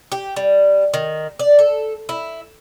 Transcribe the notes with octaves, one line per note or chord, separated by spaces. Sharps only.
G4
G3
D#3
D5
A4
E4